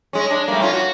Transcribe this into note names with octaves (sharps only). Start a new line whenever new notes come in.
G#3 C#4
G#3 D4
G3 A3 A#3
C#4 F4
F#4